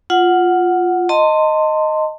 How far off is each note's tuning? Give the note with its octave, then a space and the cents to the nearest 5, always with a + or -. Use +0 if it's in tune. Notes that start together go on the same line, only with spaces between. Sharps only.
F4 +0 F#5 +0
D#5 +0 A5 +35 C6 +0